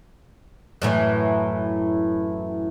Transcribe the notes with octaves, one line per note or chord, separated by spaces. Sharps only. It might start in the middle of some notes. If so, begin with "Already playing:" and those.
F#2 A2 E3